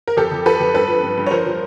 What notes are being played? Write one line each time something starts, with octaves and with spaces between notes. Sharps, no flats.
A#4
F2 G4 A4
F2
F3 A4 B4
F2
G2 A4 B4
F3
G2
G2
C#5
F3 A#4 C5
F3